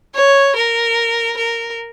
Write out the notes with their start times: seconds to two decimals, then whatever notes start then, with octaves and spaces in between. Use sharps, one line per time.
0.15 C#5
0.56 A#4
1.37 A#4